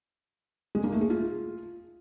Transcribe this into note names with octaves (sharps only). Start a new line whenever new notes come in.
G#3
A#3
A3
G#4
F4